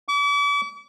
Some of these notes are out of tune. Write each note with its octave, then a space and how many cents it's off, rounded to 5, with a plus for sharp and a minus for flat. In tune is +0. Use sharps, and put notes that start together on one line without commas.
D6 -40